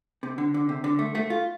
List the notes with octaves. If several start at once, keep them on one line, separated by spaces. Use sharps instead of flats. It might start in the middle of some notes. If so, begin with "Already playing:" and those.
C3
D3
D3
C3
D3
A3
A3
F4